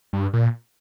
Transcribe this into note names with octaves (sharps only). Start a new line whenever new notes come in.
G2
A#2